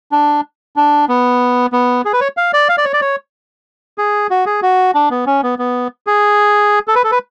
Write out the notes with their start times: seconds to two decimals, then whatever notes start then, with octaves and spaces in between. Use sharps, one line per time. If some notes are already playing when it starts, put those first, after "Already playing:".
0.12 D4
0.76 D4
1.08 B3
1.73 B3
2.05 G#4
2.13 B4
2.21 C#5
2.37 F5
2.53 D5
2.69 F5
2.78 D5
2.85 C#5
2.93 D5
3.01 C#5
3.98 G#4
4.30 F#4
4.46 G#4
4.62 F#4
4.94 D4
5.10 B3
5.27 C#4
5.43 B3
5.59 B3
6.07 G#4
6.88 A4
6.95 B4
7.04 A4
7.11 B4